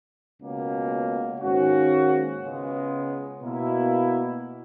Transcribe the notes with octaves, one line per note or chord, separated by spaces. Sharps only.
C#2 B2 A#3 C#4
G#2 D#3 A#3 C#4 F#4
C#2 C#3 G#3 B3
B2 A#3 E4